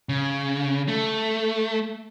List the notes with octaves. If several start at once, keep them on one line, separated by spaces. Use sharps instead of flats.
C#3
A3